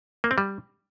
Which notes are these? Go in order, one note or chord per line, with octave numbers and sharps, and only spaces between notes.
A#3
C4
G3